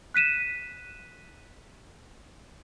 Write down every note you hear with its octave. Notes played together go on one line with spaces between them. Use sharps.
F#6 B6 D#7 E7